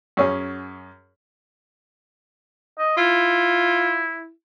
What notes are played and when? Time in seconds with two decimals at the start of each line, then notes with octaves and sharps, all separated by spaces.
0.17 F#2 C#4 G#4
2.79 D#5
2.97 E4 F4